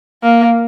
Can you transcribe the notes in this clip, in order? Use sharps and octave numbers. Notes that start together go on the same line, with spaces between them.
A#3